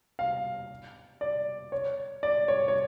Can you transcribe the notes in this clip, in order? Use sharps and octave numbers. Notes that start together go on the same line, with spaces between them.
F5
D5
C#5
D5
C#5
C#5